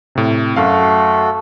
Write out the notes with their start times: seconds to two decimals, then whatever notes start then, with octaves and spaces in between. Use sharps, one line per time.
0.15 A2 C3
0.56 F#2 A3 F#4 A4 F5